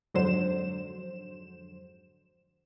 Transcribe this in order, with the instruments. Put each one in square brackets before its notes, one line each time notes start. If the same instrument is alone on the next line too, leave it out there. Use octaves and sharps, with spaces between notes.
[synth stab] F2 G#2 D3 F#3 C5 E7